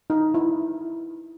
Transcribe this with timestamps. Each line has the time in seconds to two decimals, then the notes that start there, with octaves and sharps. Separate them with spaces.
0.10 D#4
0.34 E4